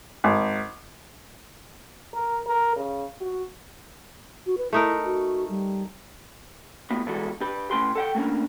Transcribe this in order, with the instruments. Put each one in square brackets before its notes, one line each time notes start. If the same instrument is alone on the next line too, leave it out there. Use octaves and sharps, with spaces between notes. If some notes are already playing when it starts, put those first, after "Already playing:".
[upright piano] G#1
[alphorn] A#4
A#4
C#3
F#4
[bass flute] F#4
B4
[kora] A3 D#4 A#4 [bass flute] E4
[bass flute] F#4
G3
[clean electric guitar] A2 B3
B2 E3 G3 G#3 F#4 A4
G4 B4
A2 C#4 B4 G5 C6
A4 F#5 G5
A3 A#3 C#4 D4